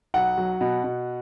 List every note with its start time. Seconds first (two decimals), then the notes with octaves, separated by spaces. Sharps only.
0.14 B1 F#5
0.38 F#3
0.61 B2
0.84 B2